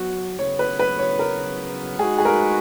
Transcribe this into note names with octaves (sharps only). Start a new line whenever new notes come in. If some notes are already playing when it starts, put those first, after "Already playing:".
Already playing: F#3 B3 F#4
C#3 F#3 B3 C#5
B4
B4
C#5
A#4
G#3 D#4 F#4 G#4 B4
G#4
A#4